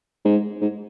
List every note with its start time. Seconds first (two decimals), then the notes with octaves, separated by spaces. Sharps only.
0.25 G#2
0.61 G#2